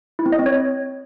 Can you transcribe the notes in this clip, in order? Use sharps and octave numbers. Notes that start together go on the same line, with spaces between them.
E4
C4
D#5
C4
C#5